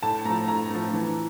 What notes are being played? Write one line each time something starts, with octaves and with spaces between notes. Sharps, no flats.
A2 A5
F3 A3 A#5
A2 A#5
F3 A3
E3